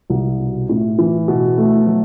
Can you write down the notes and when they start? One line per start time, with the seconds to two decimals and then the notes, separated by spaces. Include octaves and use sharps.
0.10 C2
0.40 B2
0.69 A2
0.98 E3
1.28 B2
1.58 A3
1.87 F#3